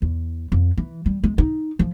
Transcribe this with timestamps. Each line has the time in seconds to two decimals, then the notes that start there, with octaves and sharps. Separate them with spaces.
0.02 E2
0.52 F2
0.77 E3
1.06 G3
1.24 G#3
1.38 D#4
1.79 F3